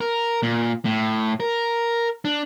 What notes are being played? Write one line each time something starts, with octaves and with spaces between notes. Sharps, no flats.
A#4
A#2
A2
A#4
D4